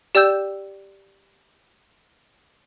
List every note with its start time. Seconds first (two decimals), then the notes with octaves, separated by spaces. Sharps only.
0.15 G4 D5 G5 E6 G6 E7